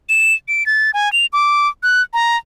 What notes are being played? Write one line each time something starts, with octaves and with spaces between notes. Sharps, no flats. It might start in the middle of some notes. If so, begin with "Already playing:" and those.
E7
D7
A6
G#5
F7
D6
F#6
A#5